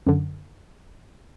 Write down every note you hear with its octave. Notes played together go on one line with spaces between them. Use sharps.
F#2 D3